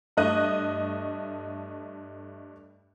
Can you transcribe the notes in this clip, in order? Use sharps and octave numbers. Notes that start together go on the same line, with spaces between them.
G2 A3 D#5 F#6 D#7